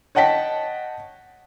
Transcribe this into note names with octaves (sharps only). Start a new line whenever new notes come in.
C#5 D#5 F#5 G5 A5 B6